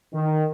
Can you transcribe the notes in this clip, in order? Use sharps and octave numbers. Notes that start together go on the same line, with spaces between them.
D#3